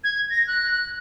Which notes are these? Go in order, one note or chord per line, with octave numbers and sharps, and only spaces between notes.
G#6
A#6
F#6
F#6